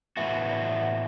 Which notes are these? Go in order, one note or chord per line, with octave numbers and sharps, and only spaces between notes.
A2 E3 B3 F#4 E5
E5
D5
E5
F#5